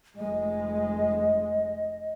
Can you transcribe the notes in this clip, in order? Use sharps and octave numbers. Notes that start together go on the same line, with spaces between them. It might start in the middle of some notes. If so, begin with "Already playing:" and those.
F1 G#3 D#5